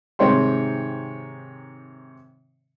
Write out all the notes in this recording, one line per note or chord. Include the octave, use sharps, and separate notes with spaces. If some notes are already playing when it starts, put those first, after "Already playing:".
G#2 C3 D#3 C#5 G5 C6